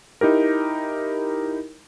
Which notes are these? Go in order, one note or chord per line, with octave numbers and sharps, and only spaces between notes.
D#4 E4 G4 A#4